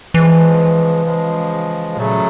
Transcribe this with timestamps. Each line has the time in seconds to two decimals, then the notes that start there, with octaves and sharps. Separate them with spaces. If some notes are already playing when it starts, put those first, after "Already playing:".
0.14 C#3 E3 F3 G#3
1.06 C#3 F3 G#3
1.97 A#2 C#3 F#3 A3